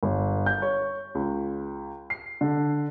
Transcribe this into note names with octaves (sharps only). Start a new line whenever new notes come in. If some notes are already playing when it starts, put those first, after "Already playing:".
G1
G6
C#5
C#2
C7
D3